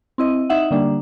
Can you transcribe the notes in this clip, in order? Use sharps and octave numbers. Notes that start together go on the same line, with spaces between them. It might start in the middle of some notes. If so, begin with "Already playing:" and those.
C4 E4 D#5
D#4 E5 F#5
D3 G3 A#3 D4